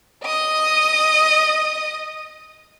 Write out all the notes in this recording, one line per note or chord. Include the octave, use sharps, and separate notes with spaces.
D#5 D#6